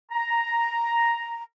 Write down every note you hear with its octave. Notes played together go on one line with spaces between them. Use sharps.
A#5